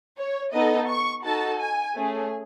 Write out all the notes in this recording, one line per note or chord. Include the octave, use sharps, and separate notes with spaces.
C#5
B3 D#4 A4 D#5
C#6
D#4 F#4 A4 A5
G#5
A3 C#4 G#4